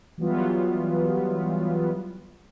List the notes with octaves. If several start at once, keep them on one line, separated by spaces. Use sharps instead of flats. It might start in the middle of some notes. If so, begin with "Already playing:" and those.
E3 F#3 G3 B3 F4